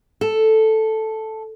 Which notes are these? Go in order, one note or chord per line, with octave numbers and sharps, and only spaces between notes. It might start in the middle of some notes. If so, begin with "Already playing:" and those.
A4